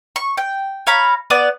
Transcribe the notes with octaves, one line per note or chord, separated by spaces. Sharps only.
C#6
G5
C#5 F5 A#5 B5
B3 D5 D6